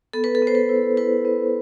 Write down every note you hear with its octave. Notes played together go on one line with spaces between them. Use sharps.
B3 A4
B4
A4
B3
C5
B4
E4
E4 B4
B3